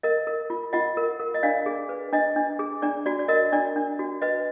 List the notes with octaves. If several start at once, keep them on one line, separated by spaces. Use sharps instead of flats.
A#4 D#5
A#4
F4
F4 D#5 F#5
A#4
A#4
D#5
D4 D5 F5
G#4
B4
D4 D#5
D4
G#4
D4 D5
F#4 D5
D5
A#4 D#5
D4 D5
D4
F#4
B4 D#5